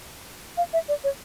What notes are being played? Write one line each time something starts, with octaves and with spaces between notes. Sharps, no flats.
F5
E5
D5
C#5